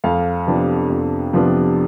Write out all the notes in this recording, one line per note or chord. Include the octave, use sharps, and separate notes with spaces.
F2 F5
C3 F3 B3 D4
F2
C3 F3 B3 D4